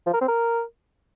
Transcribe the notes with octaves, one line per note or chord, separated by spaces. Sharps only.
F3
A#4
C4
A#4